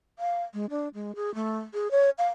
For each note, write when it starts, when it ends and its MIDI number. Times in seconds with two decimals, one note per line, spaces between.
0.19 0.43 77
0.54 0.66 56
0.70 0.88 62
0.94 1.12 56
1.16 1.33 68
1.35 1.59 57
1.74 1.91 68
1.91 2.10 73
2.18 2.28 77